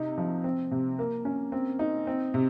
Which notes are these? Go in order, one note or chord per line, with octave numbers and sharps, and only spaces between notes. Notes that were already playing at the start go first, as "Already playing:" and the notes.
Already playing: C3 D#4
F3
C4
C3
A#3
C#4
C4
D#4
C4
C3